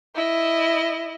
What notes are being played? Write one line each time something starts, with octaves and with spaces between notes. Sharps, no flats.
E4 D#5